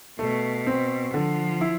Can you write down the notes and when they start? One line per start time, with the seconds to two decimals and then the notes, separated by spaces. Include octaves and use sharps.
0.19 B2 A3
0.67 C4
1.13 D3 F3
1.61 E4